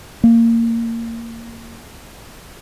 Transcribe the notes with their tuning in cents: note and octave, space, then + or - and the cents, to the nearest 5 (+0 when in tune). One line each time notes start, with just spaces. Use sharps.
A#3 -20